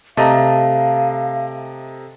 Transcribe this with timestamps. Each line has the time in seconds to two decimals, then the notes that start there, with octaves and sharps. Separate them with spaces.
0.17 C3 A3 D#5 F5 A#5